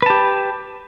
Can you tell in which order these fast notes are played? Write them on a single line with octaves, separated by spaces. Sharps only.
B4 A5 G4